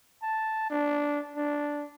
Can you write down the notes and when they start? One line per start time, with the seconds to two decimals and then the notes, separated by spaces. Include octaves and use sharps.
0.23 A5
0.70 D4
1.36 D4